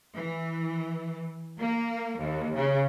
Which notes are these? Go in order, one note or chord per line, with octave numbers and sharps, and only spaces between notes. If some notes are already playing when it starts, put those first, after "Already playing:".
E3
A#3
D#2
C#3